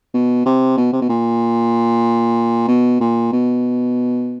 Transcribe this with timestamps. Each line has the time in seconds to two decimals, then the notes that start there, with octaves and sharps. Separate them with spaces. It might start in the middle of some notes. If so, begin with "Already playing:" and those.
0.14 B2
0.45 C3
0.77 B2
0.92 C3
1.01 B2
1.09 A#2
2.68 B2
3.00 A#2
3.32 B2